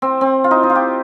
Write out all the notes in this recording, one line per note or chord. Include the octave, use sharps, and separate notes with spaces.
C4
C4
F4
D#4
D#4
F4
G4